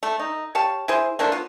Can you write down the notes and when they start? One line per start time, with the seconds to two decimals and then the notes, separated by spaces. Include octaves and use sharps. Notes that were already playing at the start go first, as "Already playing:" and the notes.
0.03 A3
0.19 D#4
0.55 G4 C#5 F5 A5
0.88 E4 G#4 C5
1.19 A3 A#3 D4 C5
1.32 B3 F4